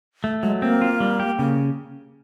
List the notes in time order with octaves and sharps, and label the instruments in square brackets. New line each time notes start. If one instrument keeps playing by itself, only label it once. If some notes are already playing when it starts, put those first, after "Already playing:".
[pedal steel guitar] A3
[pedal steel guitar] F#3 [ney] G#3
[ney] A#3 [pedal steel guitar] C4
[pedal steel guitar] F4
G3
G4
[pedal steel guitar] C#3 [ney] A#3